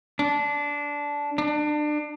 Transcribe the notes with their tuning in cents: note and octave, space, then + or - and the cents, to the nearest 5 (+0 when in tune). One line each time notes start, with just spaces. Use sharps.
D4 -15
D4 +30